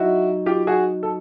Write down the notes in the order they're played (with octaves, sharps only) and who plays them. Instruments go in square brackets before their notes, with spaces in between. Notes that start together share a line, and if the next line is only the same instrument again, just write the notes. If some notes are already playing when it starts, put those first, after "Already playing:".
Already playing: [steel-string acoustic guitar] F#3 D#4 [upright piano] E4 F#4
[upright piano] F4 G4
F#4 G#4
A4